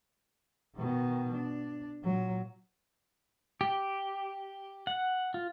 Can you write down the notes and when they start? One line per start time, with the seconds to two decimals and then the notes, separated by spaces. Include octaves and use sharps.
0.76 B2 D#3
1.33 D4
2.03 A#2 F#3
3.61 G4
4.87 F#5
5.34 F4